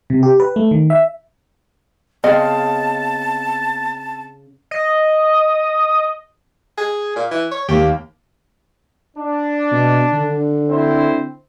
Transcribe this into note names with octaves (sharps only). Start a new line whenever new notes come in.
C3
G4
B4
A3
D#3
E5
C#3 B3 C4 D#5 G5 A5
D#5
G#4
A#2
E3
C#5
D#2 A#3 G4
D4
B2
D3
C4 E4 C5